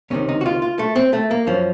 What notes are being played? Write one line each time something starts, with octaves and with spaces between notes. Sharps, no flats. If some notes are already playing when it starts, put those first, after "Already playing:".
C#2 C3 D#3 C#4
D#4
F#4
F4
F4
A3
C4
A3
A#3
F#2 F3 C#4